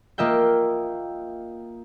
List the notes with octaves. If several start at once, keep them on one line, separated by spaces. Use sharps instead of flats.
A#3 F4 D#5 E5 G5